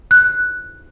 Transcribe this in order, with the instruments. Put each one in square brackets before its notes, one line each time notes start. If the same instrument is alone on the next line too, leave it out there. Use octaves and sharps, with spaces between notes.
[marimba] F#6